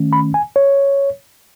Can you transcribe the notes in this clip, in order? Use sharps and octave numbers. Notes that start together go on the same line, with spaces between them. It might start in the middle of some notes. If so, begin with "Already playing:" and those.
Already playing: D#3 A3 C#4
B5
G#5
C#5